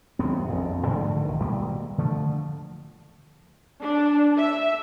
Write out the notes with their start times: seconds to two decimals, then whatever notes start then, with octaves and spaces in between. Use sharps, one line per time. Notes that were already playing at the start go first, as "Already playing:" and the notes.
0.19 D#1 F#2 B3 C4
0.49 A#1 F2 A#2
0.87 G#2 D3 F3 A3
1.25 B1 D#3
1.40 G#1 B2 G3 A#3
1.98 D3 F3 A3
3.80 D4
4.37 E5